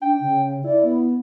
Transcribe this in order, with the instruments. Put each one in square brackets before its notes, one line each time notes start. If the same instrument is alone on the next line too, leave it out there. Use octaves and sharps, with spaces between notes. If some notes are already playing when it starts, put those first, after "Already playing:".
[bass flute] D4 [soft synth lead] G5
[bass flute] C#3
[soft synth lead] E4 [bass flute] D5
[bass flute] B3